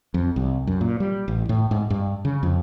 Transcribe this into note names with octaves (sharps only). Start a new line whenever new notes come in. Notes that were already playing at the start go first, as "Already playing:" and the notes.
F2
C2
F#2
A#2
G3
A1
A2
G#2
G2
C#3
F2